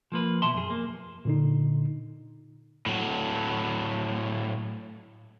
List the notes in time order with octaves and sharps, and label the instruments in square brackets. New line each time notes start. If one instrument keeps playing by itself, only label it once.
[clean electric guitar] F3 A#3 B4
B1 B2 E3 E5 A5 C6
F#2 G#4
F2 A#3
[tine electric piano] A#2 D3 D#4
[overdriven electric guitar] A2 F#3